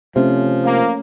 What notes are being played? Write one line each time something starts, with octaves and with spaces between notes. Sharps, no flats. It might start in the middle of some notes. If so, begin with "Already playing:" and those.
C3 F3 A3 C#4
A#3